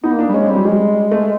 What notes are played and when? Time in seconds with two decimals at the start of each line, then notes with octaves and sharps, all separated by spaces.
0.04 B3 D#4
0.14 A#3
0.19 D4
0.29 G3
0.34 G#3 C#4
0.45 G3 C4
0.55 F#3
0.65 G3 G#3
1.12 A3